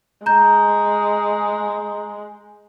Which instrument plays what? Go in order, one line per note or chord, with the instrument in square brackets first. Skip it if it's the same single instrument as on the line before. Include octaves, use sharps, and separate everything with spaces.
[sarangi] G#3 [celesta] A#5 G6